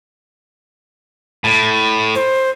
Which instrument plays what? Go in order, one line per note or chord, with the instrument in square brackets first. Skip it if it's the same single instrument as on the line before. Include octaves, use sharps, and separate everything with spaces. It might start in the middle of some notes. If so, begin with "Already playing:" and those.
[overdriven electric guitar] A2
[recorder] C5